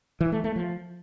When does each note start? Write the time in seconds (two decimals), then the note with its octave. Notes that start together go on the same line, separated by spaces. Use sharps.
0.20 E3
0.32 A3
0.44 A3
0.56 F3